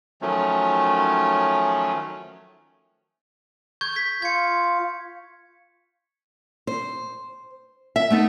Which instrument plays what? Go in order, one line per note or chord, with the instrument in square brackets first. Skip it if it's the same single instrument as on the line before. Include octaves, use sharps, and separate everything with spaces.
[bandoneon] D#3 F3 F#3 A3 C#4
[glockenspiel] C#6 G6 G#6
G#6 B6
[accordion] F4 [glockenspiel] G#6 C#7
[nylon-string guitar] C5
E5
A3 B3 D#4